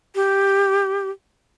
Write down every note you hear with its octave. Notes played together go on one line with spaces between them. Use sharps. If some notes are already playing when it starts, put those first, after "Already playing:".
G4